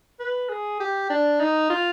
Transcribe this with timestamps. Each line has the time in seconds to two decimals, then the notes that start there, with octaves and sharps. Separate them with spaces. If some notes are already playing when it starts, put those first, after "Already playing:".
0.20 B4
0.49 G#4
0.80 G4
1.10 D4
1.40 D#4
1.70 F4